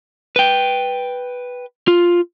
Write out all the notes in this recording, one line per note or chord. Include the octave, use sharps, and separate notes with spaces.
B4 G5
F4